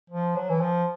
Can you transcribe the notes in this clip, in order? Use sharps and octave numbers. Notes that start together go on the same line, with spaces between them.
F3
F#3
E3
F3